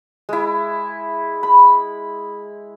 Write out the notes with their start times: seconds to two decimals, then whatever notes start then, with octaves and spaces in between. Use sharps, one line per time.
0.29 G#3 E4
1.43 B5